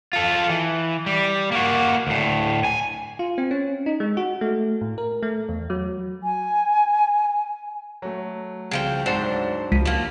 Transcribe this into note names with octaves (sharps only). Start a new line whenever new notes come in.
F4 A4
E3
G3
A#3 F#4
D2 A2
G#5
F4
C4
C#4
D#4
G#3
F#4
A3
A2
A#4
A3
E2
F#3
G#5
F#3 A3
C2 C#3 F3 G5
D2 G#2 F#3 D4 C5 F#5
C#2 F3 G3 B6 D#7
A1 A3 A#3